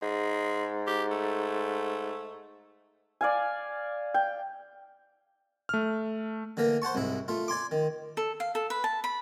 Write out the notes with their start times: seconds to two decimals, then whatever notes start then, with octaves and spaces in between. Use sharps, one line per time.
0.02 G#2 G#3
0.87 G4
1.11 A3
3.21 D5 F5 G#5
4.14 G5
5.69 A3 F6
6.57 D3 E3 A#3 A#4
6.82 C5 F#5 A5 C#6
6.95 C2 G#2 E4
7.28 A3 F4
7.48 D5 G#5 C6 D6
7.71 D#3
8.17 A4
8.40 F5
8.55 A4
8.70 B4
8.84 A5
9.04 B5